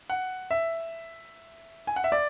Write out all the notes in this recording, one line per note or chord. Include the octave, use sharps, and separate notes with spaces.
F#5
E5
G#5
F#5
E5
D5